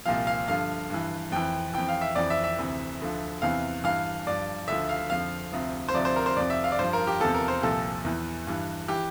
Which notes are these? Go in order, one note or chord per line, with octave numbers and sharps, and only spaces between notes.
C2 A#2 F3 F5
F5
G2 D3 F3 F5
G2 E3
F2 E3 G5
F2 E3 G5
F5
E5
F2 E3 D5
E5
E5
D2 C3 E3
D2 D3 F3
E2 C3 E3 F5
G2 E3 F5
G2 F3 D5
D2 D3 F3 E5
F5
F2 D3 F3 F5
D2 C3 F3
C5
D2 C3 F3 D5
C5
A#4
C5
F2 C3 F3 D5
E5
F5
D5
G2 F3 C5
A#4
G4
E2 C3 F3 A4
A#4
C5
C2 A#2 F3 A4
E2 E3
G2 E3
E3 G4